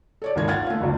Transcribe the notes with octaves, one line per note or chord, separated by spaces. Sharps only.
A4 C#5 D5
G#1 D#2 D#3 F4 A#4 G#6
F5 F#5 F6 G#6 A6
A3 F4
F#1 D2